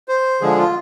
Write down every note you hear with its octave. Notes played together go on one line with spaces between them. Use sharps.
C5
D3 F3 G#3 G#4
F4